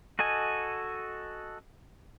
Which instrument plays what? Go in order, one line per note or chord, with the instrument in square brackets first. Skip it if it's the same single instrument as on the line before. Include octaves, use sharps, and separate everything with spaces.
[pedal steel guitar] F#4 A4 D#5 G#5